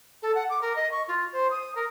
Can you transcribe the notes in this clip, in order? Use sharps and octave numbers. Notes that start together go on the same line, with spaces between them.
A4
F#5
D6
A#4
D#5
C#6
F4
C5
D#6
A#4